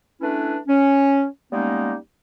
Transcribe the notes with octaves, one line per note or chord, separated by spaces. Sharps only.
A3 C#4 D4 E4 B4
C#4
G3 G#3 A#3 B3 C#4 D#4